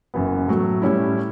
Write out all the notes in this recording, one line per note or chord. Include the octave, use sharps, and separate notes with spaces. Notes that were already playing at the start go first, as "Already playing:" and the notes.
F#1 F#2 E3 B3
A2 F#3 A3
A2 G3 C#4 E4